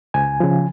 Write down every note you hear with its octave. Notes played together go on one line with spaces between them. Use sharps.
C#2 G#5
C#3 F3